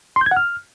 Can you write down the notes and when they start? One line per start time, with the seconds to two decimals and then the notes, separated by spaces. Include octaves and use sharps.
0.16 C6
0.21 G6
0.26 G#6
0.31 F#5
0.37 F6